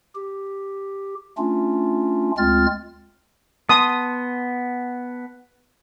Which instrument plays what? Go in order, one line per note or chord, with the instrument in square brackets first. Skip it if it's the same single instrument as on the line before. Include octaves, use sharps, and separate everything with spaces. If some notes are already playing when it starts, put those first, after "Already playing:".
[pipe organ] G4
A3 C#4 D4 F4
D2 G#3 C4 F4 F6 A6
[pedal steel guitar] B3 A5 C6 [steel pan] D#6